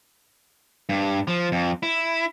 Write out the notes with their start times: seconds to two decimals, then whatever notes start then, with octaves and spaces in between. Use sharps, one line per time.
0.89 G2
1.28 F3
1.52 F2
1.83 E4